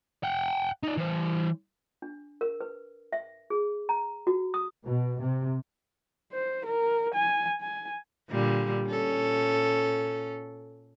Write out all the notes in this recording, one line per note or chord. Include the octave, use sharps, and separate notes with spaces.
F#5 G5
D#4 D5
E3 C5
D4
A#4
B4
E5
G#4
A#5
F#4
D#6
B2
C3
C5
A#4
G#5
G#5
A#2 D3 G3
A#2 C#4 A4